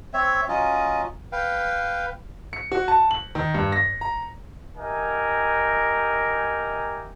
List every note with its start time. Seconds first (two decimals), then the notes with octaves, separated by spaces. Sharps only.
0.14 C4 C#5 E5
0.48 F#3 C#4 F4 D#5
1.32 B4 F5 G5
2.53 C#7
2.72 F#4
2.88 A5
3.11 F#7
3.35 D#3
3.54 G2
3.72 A#6
4.01 A#5
4.76 D#4 G4 A#4 E5 G#5